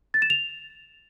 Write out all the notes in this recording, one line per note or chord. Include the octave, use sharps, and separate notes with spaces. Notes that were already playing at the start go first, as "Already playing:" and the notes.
A6
E7
F7